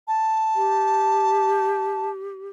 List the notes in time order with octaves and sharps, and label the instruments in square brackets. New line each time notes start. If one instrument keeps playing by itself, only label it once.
[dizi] A5
[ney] G4